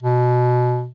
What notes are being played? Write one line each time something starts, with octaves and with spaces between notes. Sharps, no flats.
B2